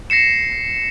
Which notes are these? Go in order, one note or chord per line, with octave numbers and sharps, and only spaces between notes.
A#6 C7 C#7 E7